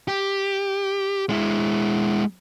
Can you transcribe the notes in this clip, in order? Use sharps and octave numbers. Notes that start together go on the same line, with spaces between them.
G4
G#3 E4